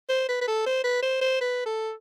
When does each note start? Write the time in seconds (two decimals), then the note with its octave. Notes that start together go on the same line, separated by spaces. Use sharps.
0.09 C5
0.29 B4
0.41 B4
0.48 A4
0.66 C5
0.84 B4
1.03 C5
1.21 C5
1.41 B4
1.65 A4